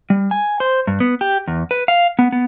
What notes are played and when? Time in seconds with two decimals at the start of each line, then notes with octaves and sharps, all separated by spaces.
0.10 G3
0.31 G#5
0.60 C5
0.87 G2
1.00 B3
1.21 G4
1.48 E2
1.71 B4
1.88 F5
2.19 B3
2.32 B3